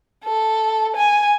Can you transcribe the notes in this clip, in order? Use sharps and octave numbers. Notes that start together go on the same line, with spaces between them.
A4
G#5